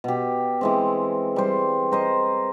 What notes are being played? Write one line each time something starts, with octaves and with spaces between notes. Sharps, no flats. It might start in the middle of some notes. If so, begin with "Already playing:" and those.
B2 G4
E3 G#3 C4
G3 C5
A#4 C5 D#5